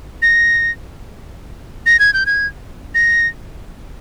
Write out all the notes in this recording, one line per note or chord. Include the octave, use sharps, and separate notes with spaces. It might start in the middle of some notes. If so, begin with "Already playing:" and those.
A#6
A#6
G#6
G6
G#6
A#6